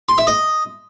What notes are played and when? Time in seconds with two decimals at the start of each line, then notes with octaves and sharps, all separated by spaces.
0.09 C6
0.18 E5
0.27 D#5